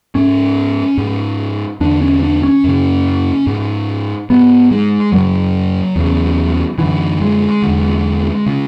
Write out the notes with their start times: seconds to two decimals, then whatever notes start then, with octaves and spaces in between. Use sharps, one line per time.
0.15 G#2 C#4
0.97 G#2
1.80 E2 D3 D4
2.02 C#4
2.23 D4
2.43 C#4
2.64 F#2 C#3
3.47 G#2
4.30 G#2 B3
4.71 G#3
5.12 F#2 C#3 F#3
5.96 E2 C#3
6.78 F#2 D3 E3
7.21 G#3
7.62 E2 D3
8.46 C#3